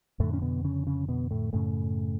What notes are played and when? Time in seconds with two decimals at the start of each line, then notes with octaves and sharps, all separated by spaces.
0.20 F2 A2 D3 A3
0.33 C#4
0.42 B2 B3
0.64 C#3 C#4
0.87 C#3 C#4
1.08 B2 B3
1.31 A2 A3
1.53 F#2 A2 C#3 A3